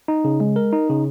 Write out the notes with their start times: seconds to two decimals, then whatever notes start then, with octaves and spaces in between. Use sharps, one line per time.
0.08 D#4
0.24 C#3
0.40 G#3
0.56 A#4
0.73 D#4
0.89 C#3